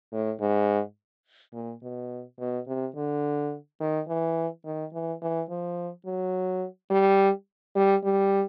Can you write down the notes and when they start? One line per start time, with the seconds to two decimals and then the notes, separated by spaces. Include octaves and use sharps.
0.12 A2
0.41 G#2
1.54 A#2
1.83 B2
2.39 B2
2.68 C3
2.96 D3
3.80 D#3
4.08 E3
4.65 D#3
4.93 E3
5.22 E3
5.50 F3
6.06 F#3
6.91 G3
7.76 G3
8.04 G3